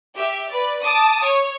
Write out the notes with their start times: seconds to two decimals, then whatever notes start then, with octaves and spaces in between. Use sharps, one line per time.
0.15 G4 E5
0.50 B4 D5
0.84 A5 D6 D#6
1.23 C#5